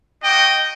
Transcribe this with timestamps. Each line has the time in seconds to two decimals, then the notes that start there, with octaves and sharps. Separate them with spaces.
0.23 A#3 D#4 F#4 D#5 G5